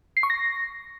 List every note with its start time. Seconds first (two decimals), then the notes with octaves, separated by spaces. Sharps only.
0.17 C7
0.23 C#6
0.30 A#6